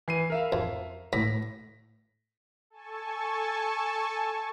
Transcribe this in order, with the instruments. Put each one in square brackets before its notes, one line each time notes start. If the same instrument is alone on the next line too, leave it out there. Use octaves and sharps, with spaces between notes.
[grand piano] E3 C7 D#7
A#4 E5 F5
[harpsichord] F2
[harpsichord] A2 [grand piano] A#6 B6
[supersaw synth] A4 G#5 A5 C#6